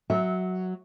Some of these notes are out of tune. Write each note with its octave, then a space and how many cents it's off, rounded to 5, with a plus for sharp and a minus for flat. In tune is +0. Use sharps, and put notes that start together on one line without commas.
F#3 +0 E5 -20